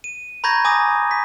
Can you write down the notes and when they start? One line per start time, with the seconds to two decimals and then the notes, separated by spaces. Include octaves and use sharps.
0.04 D#7
0.44 A#5 B5 C#6 G6 G#6 A#6
0.65 G#5 D6 D#6 A#6
1.11 B6